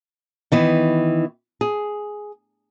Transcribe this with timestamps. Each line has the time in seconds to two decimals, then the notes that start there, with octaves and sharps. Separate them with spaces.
0.52 D#3 E3 B3
1.61 G#4